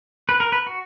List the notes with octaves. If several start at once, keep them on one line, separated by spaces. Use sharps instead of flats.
B4
A#4
B4
F#4